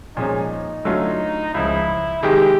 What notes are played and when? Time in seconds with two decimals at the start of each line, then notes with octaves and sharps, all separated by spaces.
0.16 A#2 F3 G#3 C#4 D#4
0.85 D3 F#3 A3 C#4 F4
1.54 C#2 C#3 F3 E4
2.23 C3 D#3 G#3 G4